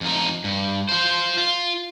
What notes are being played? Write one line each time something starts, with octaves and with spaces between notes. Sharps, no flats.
F2 D#4
G2
F4 C5
F4